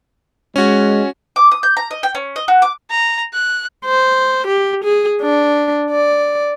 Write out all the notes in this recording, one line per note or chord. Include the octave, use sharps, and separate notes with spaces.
G#3 C#4 F#4
D6
D#6
G6
A#5
D#5
G5
C#4
D#5
F#4
D6
A#5
F#6
C5
G4
G#4
D4
D5